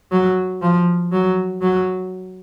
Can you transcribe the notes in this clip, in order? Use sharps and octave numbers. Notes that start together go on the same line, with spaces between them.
F#3
F3
F#3
F#3